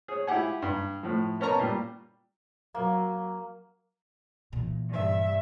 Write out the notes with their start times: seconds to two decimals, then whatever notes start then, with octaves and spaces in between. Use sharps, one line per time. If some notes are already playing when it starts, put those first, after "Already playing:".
0.08 G#4 C#5
0.27 E4 F4 G4 F#5 G#5
0.62 G2
1.03 A2 F3
1.40 B3 C#4 A#4 A5 A#5 C#6
1.59 A#2 G3
2.75 F#3 A#3
4.53 A#2 E3
4.88 G2 E5